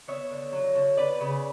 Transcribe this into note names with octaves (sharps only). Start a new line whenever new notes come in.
B3 C#5 E5
D3
F#3
D3
B3 B4 D5
C#3